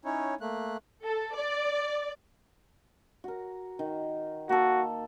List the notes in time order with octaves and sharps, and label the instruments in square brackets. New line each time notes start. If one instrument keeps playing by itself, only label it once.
[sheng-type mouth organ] C#4 D#4 E4 C#5
A3 A#3 F#6
[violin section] A4
D5
[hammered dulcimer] F#4 A#4
D#3
[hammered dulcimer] A#3 A4 [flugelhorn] F#4